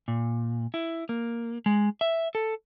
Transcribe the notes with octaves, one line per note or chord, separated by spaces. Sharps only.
A#2
E4
A#3
G#3
E5
A4